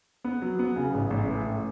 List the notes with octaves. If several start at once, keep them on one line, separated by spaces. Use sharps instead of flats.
B3
F#3
B3
C#3
A1
A1
A2
A1